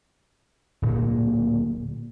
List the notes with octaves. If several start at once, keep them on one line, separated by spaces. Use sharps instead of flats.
D1 A#2 A#3